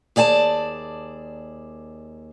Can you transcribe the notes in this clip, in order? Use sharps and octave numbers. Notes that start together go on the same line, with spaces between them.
D#2 G#4 D5 G#5 A5